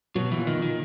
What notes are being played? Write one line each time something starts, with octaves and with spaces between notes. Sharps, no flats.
B2 F#3
A#2 E3
D#3
A#2
D#3